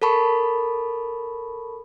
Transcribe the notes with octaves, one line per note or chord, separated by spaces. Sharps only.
A4 A#4 A5 B5 C#6